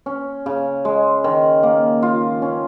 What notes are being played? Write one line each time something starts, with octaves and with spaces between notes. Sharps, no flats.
C#4
C#3
G#3
D#3
A#3
F4
C#4